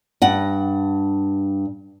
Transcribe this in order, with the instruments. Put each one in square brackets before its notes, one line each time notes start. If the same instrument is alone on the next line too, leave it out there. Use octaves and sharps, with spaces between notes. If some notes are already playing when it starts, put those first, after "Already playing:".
[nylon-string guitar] G2 F#5